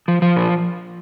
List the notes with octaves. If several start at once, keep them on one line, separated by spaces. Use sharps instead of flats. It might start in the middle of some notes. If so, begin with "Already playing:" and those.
F3
F3
A#2